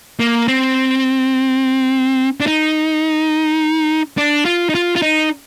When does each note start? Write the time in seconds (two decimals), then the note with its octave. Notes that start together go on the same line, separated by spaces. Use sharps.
0.20 A#3
0.48 C4
2.40 D4
2.47 D#4
4.17 D4
4.45 F4
4.69 D#4
4.75 F4
4.96 F4
5.02 D#4